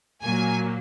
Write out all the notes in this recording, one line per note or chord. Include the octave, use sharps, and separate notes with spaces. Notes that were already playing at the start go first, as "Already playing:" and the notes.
A#2 F#3 A#3 G#5